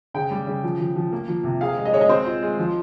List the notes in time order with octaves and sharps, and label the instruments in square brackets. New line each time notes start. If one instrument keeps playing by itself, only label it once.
[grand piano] C#3 [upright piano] G5
[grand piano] G3
C#3
F3
F3
F3
A#3
F3
C3
[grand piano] G#4 [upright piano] F5
[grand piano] G#3
[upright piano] D#5
[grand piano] G#3 [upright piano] C#5
[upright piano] D#5
[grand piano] C4 [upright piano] C5
[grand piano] F4
G#3
F3